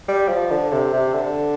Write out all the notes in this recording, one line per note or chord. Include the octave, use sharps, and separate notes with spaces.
G3
F3
D3
C3
C3
D3